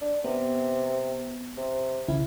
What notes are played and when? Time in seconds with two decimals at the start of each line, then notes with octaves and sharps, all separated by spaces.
0.01 D4
0.24 C3 B3
1.57 C3
2.08 C2 C#3 E4